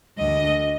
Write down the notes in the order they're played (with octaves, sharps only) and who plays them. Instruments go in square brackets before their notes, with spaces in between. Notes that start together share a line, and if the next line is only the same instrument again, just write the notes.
[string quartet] D2 D3 D#5